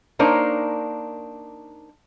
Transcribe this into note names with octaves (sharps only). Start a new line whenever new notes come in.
A#3 D4 D#4 A#4 C5 C#5